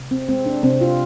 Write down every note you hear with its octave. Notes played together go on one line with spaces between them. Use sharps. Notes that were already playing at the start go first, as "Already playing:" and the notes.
Already playing: C3
C4
G#3 C4
D4
C3 C4
F4